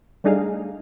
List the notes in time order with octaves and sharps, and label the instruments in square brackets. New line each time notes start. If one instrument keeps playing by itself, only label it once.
[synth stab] G3 A3 D4 D#4 G#4 F5